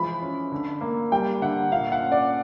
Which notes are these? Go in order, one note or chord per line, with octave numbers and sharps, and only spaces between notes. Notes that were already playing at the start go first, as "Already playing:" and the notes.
Already playing: E3 F3 G#3 B5
C#4
D3
A#3
G3 G5
D3 F#5
A#2 F5
F#5
C#4
D5